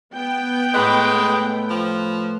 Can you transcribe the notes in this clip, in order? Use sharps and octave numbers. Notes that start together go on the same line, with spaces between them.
B3 G5
A2 G#3 B4 F#5
F3